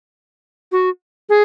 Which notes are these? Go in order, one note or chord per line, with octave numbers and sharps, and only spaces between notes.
F#4
G#4